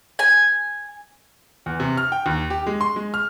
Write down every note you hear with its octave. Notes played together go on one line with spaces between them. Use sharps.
G#5
E2
C3
F6
G5
D#2
G4
G#3
C6
G#3
F6